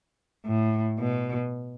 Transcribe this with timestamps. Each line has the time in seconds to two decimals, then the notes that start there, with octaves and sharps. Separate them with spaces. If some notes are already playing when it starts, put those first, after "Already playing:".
0.45 A2
0.97 B2